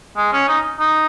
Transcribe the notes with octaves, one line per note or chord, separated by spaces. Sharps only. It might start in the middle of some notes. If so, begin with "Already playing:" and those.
G#3
C#4
D#4
D#4